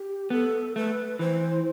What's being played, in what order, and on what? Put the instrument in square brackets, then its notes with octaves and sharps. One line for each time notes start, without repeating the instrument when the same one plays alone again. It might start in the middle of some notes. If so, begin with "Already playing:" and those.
Already playing: [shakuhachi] G4
[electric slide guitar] B3 [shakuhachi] A4
[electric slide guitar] A3 [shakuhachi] B4
[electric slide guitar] E3 [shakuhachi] C5